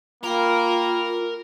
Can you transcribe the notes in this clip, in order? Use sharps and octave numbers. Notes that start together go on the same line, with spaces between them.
A#3 F4 A#4 F5 G5 B5